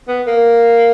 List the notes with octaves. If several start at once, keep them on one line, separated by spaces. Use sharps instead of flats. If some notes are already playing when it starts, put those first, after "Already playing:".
B3
A#3